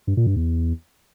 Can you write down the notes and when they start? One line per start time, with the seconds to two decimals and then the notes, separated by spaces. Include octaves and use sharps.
0.07 G2
0.17 A#2
0.27 G2
0.36 E2